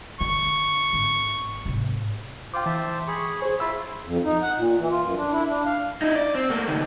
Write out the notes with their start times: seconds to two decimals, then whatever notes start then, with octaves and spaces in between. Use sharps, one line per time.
0.21 D3 C#6
0.93 G#1
1.65 G#2 C3
2.54 F4 C5 G5 D6
2.66 E3 C5 E5 A5
3.08 G#4 B5 C#6
3.42 G#4 C5 C#5
3.60 E4 F4 F5 E6 B6
4.04 F2
4.24 D#4
4.42 F#5
4.57 A#2
4.78 E3
4.91 F4
5.03 F#2
5.17 D4
5.32 E4
5.48 D4
5.66 F5
6.02 D#4 E4
6.16 D5
6.35 C4
6.50 A3 A#3
6.68 C#2 D#3